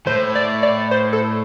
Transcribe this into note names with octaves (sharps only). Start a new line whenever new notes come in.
A2 C5
D5
D5
C5
A4